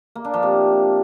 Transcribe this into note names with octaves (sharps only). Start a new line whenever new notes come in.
A#3
D4
F3
C3